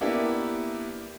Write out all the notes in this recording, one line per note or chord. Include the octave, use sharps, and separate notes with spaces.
A#3 B3 D4 E4 G4